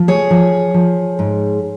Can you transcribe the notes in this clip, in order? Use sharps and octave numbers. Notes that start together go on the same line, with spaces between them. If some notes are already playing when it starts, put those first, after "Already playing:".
Already playing: F3
G#4 C#5
F3
F3
G#2